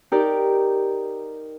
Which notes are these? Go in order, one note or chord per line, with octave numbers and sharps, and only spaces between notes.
D#4 G4 A#4 D5